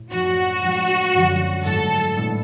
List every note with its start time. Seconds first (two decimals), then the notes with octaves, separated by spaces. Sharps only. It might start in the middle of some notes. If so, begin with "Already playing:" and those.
Already playing: A2
0.12 F#2 F3 A3 D4 F#4
0.62 F2 F3 G#3 D4
1.15 F#2 D3 F3
1.65 G#2 F#3 A3 A4
2.16 A2 G#3 B3 D4